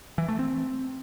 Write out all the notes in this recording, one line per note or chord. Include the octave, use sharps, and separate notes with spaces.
E3
A3
C4